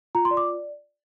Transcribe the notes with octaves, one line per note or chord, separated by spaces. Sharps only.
F4 A#5
C6
D5
D6